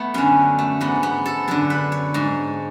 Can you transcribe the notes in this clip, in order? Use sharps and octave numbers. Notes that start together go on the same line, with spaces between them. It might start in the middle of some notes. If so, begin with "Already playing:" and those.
Already playing: A3 B3
F#2 D3 C#4
A3
G#2 B3
B3
A4
F#2 D3 A4
B4
C#5
G#2